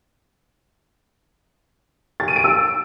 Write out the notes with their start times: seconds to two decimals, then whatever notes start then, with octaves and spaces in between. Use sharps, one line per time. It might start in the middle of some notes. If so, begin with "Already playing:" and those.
2.20 A6
2.28 D#7
2.36 D7
2.44 E6